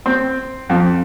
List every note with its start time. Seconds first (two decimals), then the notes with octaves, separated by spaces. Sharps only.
0.06 C4
0.70 F2